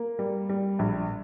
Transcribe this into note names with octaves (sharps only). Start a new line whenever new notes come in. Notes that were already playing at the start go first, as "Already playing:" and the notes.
Already playing: A#3
G3
G3
A#1